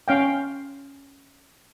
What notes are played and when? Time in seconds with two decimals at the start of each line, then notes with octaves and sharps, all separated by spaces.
0.08 C#4 F5 G5